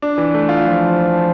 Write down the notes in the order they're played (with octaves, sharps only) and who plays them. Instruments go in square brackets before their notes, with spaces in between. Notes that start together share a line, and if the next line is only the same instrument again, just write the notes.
[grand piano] D4
E3
A3
F4
[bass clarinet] F3